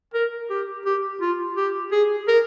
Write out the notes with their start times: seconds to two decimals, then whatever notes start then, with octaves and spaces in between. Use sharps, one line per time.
0.14 A#4
0.50 G4
0.86 G4
1.21 F4
1.57 G4
1.92 G#4
2.29 A#4